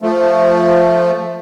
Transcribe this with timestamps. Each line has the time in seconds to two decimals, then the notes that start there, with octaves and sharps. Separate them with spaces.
0.02 F3 A3